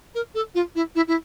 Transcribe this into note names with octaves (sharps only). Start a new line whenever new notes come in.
A#4
A4
F4
E4
E4
E4